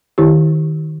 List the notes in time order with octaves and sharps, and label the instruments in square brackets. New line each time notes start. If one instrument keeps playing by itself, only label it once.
[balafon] D#3 E4 G4